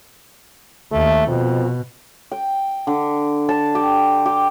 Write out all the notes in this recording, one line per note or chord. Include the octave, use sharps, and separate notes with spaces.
D#2 A3
F2 B2
G5
D3
A5
G4
G4